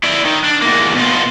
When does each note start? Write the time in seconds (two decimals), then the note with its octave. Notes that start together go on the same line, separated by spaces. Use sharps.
0.04 E4 D5
0.25 D#3
0.44 D4
0.62 E2 A#3
0.96 B2 F4